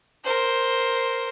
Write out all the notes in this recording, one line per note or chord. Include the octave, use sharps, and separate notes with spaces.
A#4 C5